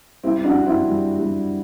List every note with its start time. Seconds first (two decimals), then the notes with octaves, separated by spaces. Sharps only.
0.24 G3 C4 E4
0.44 D4 F#4
0.56 D4
0.66 C4 E4
0.88 G3
1.19 G3